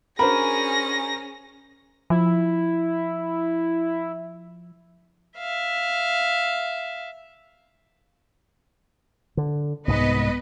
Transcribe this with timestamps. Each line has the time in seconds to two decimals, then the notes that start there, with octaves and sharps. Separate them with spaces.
0.19 C#4 D4 F#4 G#4 A#4 C5 B5 A#6
2.10 F3 E4
5.38 E5 F5
9.37 D3
9.88 C2 G#2 G#3 B3 B4 D#5